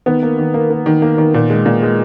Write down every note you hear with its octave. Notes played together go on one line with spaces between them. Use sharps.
D#3 B3
A#3
D#3
A#3
A#3
D#3
A#3
D#3
A#2
G#3
A#2
G#3